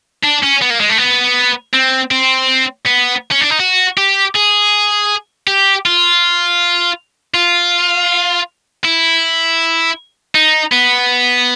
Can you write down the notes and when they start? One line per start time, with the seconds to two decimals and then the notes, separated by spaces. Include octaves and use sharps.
0.23 D4
0.43 C#4
0.61 B3
0.70 A#3
0.80 G#3
0.90 A3
0.98 B3
1.74 C4
2.11 C4
2.86 B3
3.32 C#4
3.41 D4
3.51 D#4
3.60 F#4
3.97 G4
4.35 G#4
5.47 G4
5.86 F4
7.34 F4
8.85 E4
10.35 D#4
10.72 B3